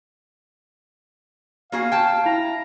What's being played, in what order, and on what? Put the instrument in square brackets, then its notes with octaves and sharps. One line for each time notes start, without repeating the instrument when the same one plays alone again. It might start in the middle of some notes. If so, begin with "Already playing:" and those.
[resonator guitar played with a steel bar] A#3 F#4 G#4 [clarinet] F5
[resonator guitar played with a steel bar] G5 A5
[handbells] E4 [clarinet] A#5